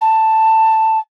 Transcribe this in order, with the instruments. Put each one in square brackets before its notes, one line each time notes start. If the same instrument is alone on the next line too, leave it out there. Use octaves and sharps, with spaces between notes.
[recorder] A5